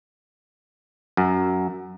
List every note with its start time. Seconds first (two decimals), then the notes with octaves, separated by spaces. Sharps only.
1.17 F#2